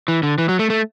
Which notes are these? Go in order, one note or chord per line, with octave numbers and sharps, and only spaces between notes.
E3
D3
E3
F#3
A3
A3